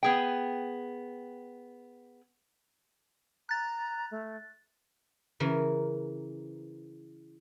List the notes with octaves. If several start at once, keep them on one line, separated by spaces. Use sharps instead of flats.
B3 G#4 G5
A#5 F#6 A6
A3
C#3 E3 A#4